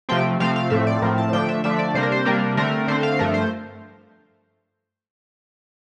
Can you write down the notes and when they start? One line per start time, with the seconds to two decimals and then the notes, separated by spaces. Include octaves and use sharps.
0.09 C3 F3 A3 C4 G5
0.40 C3 F3 A3 C4 F5
0.56 F5
0.70 A2 F3 A3 C4 E5
0.87 D5
1.02 A2 F3 A3 C4 A#4
1.18 A5
1.32 D3 F3 A3 D4 G5
1.49 E5
1.64 D3 F3 A3 D4 E5
1.79 D5
1.95 C3 G3 A#3 D4 C5
2.03 A#4
2.12 C5
2.25 C3 G3 A#3 D4 A#4
2.57 D3 A3 C4 A#4
2.88 D3 A3 C4 C5
3.03 F5
3.19 G2 F3 A3 A#4
3.34 C5